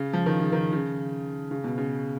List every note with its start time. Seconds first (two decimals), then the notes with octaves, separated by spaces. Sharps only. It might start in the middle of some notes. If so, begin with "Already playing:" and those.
Already playing: C#3
0.13 F3
0.26 D#3
0.40 C#3
0.52 D#3
0.73 C#3
1.51 C#3
1.64 B2
1.78 C#3